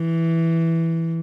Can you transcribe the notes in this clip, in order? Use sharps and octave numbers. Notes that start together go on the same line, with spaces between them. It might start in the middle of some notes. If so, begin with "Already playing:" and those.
Already playing: E3